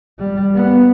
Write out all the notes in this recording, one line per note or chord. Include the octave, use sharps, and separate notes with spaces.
G3
B3